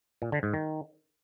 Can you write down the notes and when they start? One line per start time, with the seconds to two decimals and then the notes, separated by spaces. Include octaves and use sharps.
0.22 A#2
0.32 D3
0.43 G#2
0.54 D#3